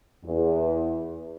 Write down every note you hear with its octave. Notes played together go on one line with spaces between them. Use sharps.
E2